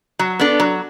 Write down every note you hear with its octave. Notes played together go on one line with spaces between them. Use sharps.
F#3
B3 D4 A4
F#3